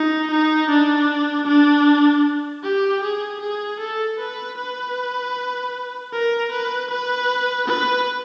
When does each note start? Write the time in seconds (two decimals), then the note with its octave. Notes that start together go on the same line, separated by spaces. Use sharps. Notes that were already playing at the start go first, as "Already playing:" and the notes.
Already playing: D#4
0.30 D#4
0.69 D4
1.47 D4
2.63 G4
3.02 G#4
3.41 G#4
3.79 A4
4.19 B4
4.57 B4
6.13 A#4
6.51 B4
6.90 B4
7.67 B4